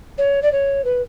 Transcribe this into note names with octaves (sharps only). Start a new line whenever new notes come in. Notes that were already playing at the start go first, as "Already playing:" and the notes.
C#5
D5
C#5
B4